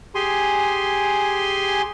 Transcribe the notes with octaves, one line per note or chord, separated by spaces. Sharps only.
G4 G#4 G#5 C6